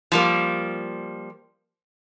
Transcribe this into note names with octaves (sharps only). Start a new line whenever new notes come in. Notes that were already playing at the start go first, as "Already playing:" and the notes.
F3 G3 A#3